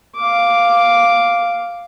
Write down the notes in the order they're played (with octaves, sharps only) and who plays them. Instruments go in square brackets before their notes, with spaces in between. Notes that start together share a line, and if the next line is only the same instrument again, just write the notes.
[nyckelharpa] F5 D6